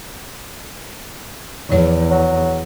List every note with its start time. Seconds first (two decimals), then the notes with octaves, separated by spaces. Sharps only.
1.70 E2 F3 C#5
2.11 F#3